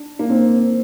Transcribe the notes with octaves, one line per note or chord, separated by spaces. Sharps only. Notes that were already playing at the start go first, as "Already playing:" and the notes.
Already playing: D4
A#3
C4